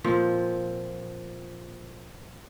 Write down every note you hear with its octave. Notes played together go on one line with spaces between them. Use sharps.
A#2 F3 C4